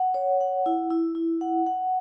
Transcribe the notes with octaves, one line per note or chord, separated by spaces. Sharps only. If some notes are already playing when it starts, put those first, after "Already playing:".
Already playing: F#5
C#5
F#5
E4
E4
E4
F#5
F#5